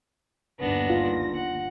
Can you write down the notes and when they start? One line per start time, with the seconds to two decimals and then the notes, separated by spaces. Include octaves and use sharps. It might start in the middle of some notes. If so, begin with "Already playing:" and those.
0.59 G1 D#2 B3 D4 A#6
0.90 F4
1.35 F#5